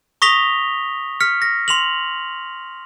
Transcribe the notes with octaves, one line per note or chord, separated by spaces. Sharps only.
C#6 D#6 A#6 B6 F7 G7
F6 B6 C#7
A#6
C6 F7 F#7